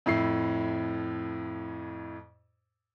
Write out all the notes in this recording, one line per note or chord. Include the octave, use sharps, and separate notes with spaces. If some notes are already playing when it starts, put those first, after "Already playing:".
F2 A2 E4 C7